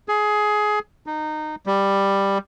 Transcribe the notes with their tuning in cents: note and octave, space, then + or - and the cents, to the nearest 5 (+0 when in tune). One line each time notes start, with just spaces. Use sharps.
G#4 +20
D#4 -20
G3 +10